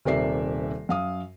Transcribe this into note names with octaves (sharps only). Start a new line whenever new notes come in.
D#1 C3 A#4 D5 E5 C7
F#2 F5 D#6